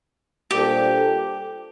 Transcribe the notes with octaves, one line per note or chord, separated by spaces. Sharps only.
A#2 G3 D4 G4 A4 C5